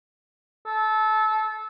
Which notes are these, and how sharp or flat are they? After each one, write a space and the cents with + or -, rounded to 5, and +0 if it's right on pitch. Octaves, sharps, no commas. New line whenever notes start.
A4 -20